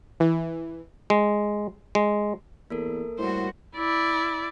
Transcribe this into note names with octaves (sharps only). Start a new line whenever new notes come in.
E3
G#3
G#3
E2 A#3 A4 A#4
A2 G3 F#4 C5
E4 D5